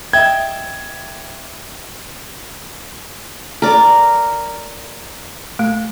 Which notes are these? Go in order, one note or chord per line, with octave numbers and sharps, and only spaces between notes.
D#5 E5 G5 G#6
A#4 D5
A3